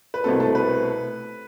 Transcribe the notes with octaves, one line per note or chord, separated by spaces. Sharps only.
B4
C2 B2 A3 C4 A4
A4
B4